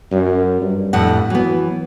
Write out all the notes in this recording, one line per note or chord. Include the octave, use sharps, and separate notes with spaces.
F#2
G2
F2 A2 F#5
E3 F#3 B3